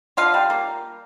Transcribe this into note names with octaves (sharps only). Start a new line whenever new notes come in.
D3 F4 F5
G3
A#3